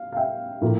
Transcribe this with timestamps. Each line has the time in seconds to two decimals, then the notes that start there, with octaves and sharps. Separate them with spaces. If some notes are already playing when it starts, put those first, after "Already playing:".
Already playing: F5
0.13 F5
0.17 E5 G5
0.61 A2 F3 A#3 F4